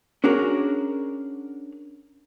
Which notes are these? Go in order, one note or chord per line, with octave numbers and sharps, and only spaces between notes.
C#4 D4 F#4 G#4 A#4